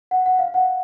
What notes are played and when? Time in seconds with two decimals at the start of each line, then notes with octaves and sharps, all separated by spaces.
0.11 F#5
0.26 F#5
0.39 F5
0.54 F#5